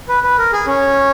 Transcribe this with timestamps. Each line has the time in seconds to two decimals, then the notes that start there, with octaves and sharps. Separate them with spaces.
0.09 B4
0.23 B4
0.38 A#4
0.53 G#4
0.67 C#4